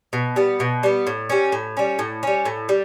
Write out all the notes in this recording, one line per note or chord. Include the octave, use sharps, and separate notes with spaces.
B2
G3 B3
B2
G3 B3
A2
G3 C#4
A2
G3 C#4
A2
G3 C#4
A2
G3